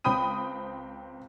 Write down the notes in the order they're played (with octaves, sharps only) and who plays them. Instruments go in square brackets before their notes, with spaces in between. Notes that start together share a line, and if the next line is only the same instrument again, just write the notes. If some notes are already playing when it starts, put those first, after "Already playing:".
[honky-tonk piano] C#2 C4 G5 B5 D#6 D#7